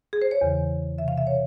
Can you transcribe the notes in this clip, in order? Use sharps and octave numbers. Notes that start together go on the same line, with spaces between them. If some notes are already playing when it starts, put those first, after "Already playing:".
G#4
C5
C#5
E2 C#3 E3
E2 C3 E3 E5
F5
E5
C#5